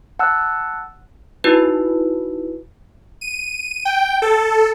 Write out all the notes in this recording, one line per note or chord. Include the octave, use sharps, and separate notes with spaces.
F#5 A5 E6 F#6
D#4 E4 F#4 B4
D#7
G5
A4